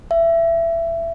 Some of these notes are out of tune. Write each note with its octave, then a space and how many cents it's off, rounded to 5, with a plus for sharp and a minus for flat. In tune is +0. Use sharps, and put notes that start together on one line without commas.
E5 +20